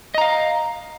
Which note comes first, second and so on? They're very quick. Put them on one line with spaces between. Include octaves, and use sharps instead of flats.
D#5 A#5 F5